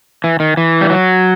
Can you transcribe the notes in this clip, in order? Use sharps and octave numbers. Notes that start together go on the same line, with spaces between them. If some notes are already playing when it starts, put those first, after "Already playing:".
E3
D#3
E3
G3
F#3